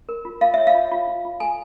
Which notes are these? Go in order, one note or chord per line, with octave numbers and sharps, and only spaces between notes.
A#4
F4
F4 F5
C#5 E5
F5
F4
F4
F4
F4
A4 G#5